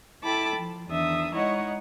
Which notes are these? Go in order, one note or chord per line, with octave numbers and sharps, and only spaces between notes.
E4 A4 G5 A5 B5 D6
F3
E2 D#3 D4 E5 D#6
G#3 D#4 E4 C#5 D#5 F#5